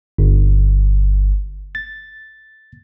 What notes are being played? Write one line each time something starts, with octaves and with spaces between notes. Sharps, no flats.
G1
A6